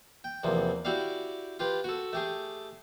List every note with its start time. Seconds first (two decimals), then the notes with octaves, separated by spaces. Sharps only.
0.24 G5
0.43 E2 C3 F3 A#3
0.85 E4 F#4 G4 D5 F5
1.59 F4 G4 B4
1.84 F#4 A4
2.13 A3 G4 G#4